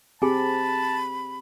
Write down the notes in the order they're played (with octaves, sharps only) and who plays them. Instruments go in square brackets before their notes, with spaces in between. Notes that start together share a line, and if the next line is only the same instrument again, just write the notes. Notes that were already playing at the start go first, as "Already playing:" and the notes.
[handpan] C4 G4 [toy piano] G#4 G#5 [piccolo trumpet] A5 [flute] B5